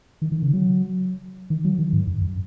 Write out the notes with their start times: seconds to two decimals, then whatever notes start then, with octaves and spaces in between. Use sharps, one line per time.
0.22 D#3
0.32 D#3
0.42 C#3
0.53 F#3
1.50 D#3
1.64 F#3
1.78 D#3
1.93 G#2
2.07 F#2
2.21 F#2